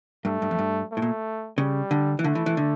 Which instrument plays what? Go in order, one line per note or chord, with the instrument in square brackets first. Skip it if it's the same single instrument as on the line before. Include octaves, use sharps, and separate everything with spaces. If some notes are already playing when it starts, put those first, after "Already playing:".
[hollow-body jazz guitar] G2 [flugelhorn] A3
[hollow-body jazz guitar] G2
F2
G2
[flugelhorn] A3
[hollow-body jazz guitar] A2
A#2
[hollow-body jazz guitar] C#3 [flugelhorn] G3
[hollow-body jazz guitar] D3
E3
[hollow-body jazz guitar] D3 [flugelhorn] A3
[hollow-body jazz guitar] E3
E3
D3